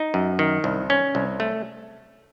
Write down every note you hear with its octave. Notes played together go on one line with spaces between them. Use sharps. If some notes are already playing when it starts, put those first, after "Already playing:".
Already playing: D#4
F#2
D#3
C2
C#4
C2
A3